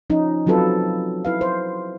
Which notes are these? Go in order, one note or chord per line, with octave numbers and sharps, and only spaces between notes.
F3 C#4 D#4
F3 F#3 C4 F4 A4 B4
E4 B4 F5
C5